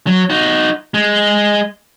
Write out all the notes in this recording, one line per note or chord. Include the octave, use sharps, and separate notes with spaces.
F#3
D#4 F#4
G#3